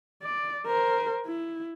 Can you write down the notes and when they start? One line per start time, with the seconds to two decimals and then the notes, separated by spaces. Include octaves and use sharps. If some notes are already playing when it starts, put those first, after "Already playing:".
0.23 D5
0.66 A#4 C5
1.26 E4